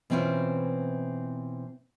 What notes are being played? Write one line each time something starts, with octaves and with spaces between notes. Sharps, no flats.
B2 E3 C4 C#4 E4 F4